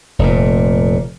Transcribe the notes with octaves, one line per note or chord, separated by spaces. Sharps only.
F1 A#2